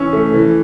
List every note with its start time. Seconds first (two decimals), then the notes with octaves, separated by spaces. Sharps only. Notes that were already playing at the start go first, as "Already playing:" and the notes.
Already playing: E3 C#4 E6
0.13 A3
0.34 E3